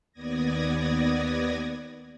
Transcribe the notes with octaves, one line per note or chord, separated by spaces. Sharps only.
D#2 B3 D5 D#6 G#6 A#6